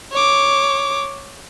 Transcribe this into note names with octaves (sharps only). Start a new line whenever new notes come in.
C#5 D6